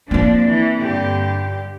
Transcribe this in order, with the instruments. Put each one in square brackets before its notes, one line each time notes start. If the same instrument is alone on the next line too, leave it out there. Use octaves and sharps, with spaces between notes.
[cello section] F3 D4 [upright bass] A#3 C4
[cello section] E3
G2 D3 G4